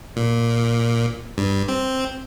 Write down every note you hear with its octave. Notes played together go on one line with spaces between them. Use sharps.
A#2
G2
C4